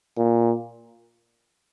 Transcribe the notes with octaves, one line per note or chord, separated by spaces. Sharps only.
A#2